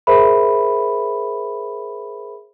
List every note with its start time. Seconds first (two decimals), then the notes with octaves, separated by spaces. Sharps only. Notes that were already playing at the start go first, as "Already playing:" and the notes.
0.07 G#4 A#4 C5 E5 B5